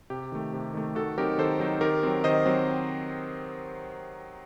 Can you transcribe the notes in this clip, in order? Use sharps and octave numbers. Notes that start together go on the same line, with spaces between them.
C3 G4
D#3 A3
C3
D#3 A3
D#3 F#4 A4
F#3 C4 D#4 G4 A#4
D#3 A4 C5
F#3 C4 D#4
D#3 G4 A#4
F#3 C4
D#3 C5 D#5
F#3 C4